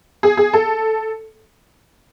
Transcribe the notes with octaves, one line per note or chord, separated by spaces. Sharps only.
G#4
G#4
A4